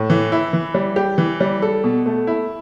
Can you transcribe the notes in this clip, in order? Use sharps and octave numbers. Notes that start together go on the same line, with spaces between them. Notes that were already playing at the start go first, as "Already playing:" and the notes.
Already playing: A2
E3
E4
E3
G3
G4
E3
G3
A4
B2
A3
E4